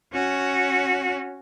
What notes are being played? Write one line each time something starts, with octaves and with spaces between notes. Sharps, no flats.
C#4 F#4